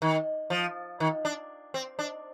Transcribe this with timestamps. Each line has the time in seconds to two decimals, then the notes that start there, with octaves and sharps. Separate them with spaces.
0.02 D#3
0.50 F3
1.00 D#3
1.25 D4
1.74 C4
1.99 D4